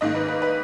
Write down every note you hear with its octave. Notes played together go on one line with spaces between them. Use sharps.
G#2 D#3 A#3 D#5
B4
B4
B4